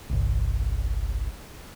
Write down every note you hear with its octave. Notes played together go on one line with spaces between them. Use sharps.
G1 C2